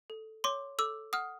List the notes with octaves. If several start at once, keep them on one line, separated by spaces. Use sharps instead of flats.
A4
C#5 C6 D6
A4 D6 E6
F#5 D#6 F6